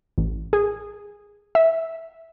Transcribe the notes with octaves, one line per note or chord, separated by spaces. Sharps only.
A1
G#4
E5